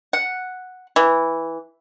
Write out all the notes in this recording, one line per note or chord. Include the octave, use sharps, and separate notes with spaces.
F#5
E3